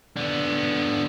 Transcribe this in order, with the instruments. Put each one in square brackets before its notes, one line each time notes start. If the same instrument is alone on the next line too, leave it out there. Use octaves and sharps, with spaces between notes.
[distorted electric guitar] D3 B3